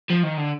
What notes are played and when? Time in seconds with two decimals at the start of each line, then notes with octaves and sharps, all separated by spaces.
0.10 F3
0.23 D#3
0.37 D3